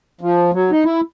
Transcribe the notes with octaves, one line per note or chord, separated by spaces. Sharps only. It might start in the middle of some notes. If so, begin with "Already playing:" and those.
F3
F#3
D#4
E4